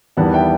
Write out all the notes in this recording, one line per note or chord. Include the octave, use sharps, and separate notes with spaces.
E2 D#3 G3 B3 F#5 A5
E5 G5